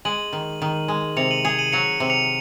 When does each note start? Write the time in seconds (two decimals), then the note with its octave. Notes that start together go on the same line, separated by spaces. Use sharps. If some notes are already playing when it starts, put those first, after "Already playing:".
0.05 G#3 D#7 F#7
0.33 D#3
0.62 D#3
0.88 G#3
1.17 C3 C#7 F7
1.31 D#7 F#7
1.45 G#4 C#7 F7
1.59 D#7 F#7
1.73 F#3 C#7 F7
2.00 C3 F#7
2.10 C#7 F7